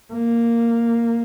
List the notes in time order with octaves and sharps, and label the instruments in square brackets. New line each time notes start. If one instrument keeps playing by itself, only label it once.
[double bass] A#3